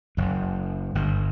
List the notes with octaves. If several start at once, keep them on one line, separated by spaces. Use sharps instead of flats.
F#1 F#2
G1 G2